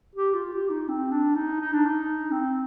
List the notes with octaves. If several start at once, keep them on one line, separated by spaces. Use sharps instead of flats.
G4
F4
G4
D#4
C4
D4
D#4
D#4
D4
D#4
C4